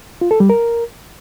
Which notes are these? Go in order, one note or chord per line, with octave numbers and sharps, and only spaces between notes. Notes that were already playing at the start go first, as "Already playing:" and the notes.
F4
A4
G3
A#4